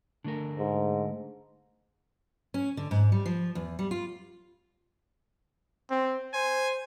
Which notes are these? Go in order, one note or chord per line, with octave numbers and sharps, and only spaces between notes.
D3 A3 A#4
G#2
C#4
D3
G#2
G3
F3
E2
G3
F4
C4
C5 G#5